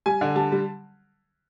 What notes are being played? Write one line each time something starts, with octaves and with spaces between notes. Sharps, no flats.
G3 G#5
D3
G3 A5
G3